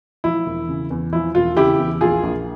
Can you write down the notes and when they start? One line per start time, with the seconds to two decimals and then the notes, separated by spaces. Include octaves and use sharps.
0.24 F3 E4
0.46 E1
0.69 C#3
0.90 E2
1.13 F3 E4
1.35 E1 F4
1.57 C#3 E4 G4
1.79 E2
2.01 A#1 F4 G#4
2.23 A#1